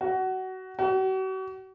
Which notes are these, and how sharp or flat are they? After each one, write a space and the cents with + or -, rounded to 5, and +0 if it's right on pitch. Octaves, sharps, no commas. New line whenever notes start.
F#4 +20
F#4 +40